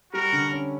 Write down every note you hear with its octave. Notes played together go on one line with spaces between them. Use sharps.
G3 F#4 A#4
D3
C#4